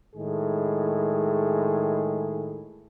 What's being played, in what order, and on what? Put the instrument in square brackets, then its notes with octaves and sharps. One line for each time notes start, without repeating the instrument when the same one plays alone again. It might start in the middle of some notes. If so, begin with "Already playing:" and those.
[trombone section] A2 D#3 G#3 G#4